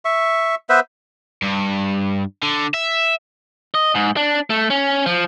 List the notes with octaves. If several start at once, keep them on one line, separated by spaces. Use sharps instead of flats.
E5 C#6
B3 B4 C5 E5
G2
D3
E5
D#5
G#2
D4
A3
C#4
F3